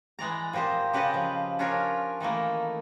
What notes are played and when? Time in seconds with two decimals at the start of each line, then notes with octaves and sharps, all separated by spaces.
0.19 E3 G#3 D5 A#5
0.53 A#2 C4 G4 C5 D#5
0.93 C#3 G4 B4 D#5 F#5 A5
1.14 F3
1.59 C#4 D4 F4 A#4 C#5
2.20 D#3 E3 A3 A#3